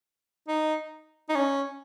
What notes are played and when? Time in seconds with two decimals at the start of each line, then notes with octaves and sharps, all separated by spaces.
0.48 D#4
1.29 D#4
1.35 C#4